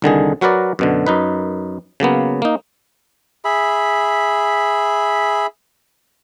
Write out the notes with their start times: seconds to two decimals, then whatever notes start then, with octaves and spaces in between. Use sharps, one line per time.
0.02 C2 D3 D#3 G#4
0.41 F#3 F#4 A#4 B4 D5
0.79 F#2 B2 D3
1.07 F#2 D#4 B4
2.00 C#3 F#3 A#3 B3
2.42 A#3 D#4
3.45 G#4 E5 B5